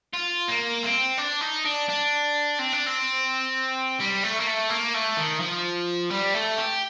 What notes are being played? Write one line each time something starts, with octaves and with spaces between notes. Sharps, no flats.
F4
A#3
C4
D4
D#4
D4
D4
C4
D4
C4
G3
A3
A#3
A3
A#3
A3
D#3
F3
G3
A3
G4